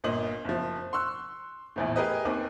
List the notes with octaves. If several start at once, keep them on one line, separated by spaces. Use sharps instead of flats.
G1 A#2 D#5 F#7
F#1 F3
C6 C#6 E6 F#6
A#1 E2 A2
G4 G#4 A#4 B4 D#5
D#2 D#3 C4 B4 D6